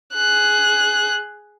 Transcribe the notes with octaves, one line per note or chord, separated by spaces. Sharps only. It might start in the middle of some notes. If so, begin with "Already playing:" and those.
G#4 F#6